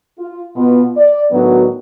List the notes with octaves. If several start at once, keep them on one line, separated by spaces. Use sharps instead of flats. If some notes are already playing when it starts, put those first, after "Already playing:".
F4
B2 B3 F4
D5
A2 D#3 F#3 B3 D4 F#4